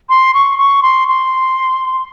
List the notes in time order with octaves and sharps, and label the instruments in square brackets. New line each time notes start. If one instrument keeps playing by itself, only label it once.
[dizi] C6
C#6
C#6
C6
C6